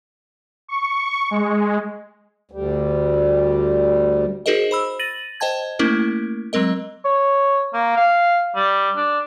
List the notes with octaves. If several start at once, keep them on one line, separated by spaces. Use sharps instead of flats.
C#6
G#3
D2 G3
D#4 F#4 G#4 A#4 C5 D#5
C5 B5 E6
A6 A#6 D#7 F#7
C5 D#5 G5 A5 G#6
A3 A#3 C#4 E4 A#4
F#3 G#3 C4 A#4 D#5
C#5
A#3
F5
G3
D4